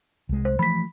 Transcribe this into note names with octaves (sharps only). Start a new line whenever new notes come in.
C2 G#3
C5
E3 F3 A3 B5 B6